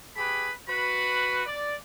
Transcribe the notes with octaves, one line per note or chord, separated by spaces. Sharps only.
G4 G#4 B4 B5
F#4 B4 B5
D5